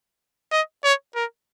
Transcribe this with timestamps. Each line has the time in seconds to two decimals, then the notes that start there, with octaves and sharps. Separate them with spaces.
0.52 D#5
0.84 C#5
1.15 A#4